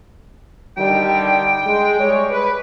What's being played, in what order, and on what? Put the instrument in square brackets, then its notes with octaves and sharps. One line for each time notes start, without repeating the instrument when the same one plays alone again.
[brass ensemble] D3 D#3 G3 [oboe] G5
[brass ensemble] G#3
G3 G#3 C#5
B4